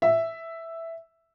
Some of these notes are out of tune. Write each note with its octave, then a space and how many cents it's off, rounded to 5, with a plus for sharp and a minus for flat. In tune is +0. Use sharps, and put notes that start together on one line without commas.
E5 +0